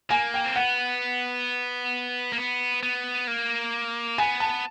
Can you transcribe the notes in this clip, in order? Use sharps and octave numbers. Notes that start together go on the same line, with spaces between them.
A#3 G#5
G5
C4
B3 F#5
A#3
B3
B3
A#3
B3 G#5
A5